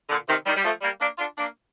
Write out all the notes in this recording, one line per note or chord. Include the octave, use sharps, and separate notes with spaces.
A#2 D3
C3 D#3
D#3 G3
G3
F3 A3
G3 A#3
A#3 D4
D4 F4
A#3 D4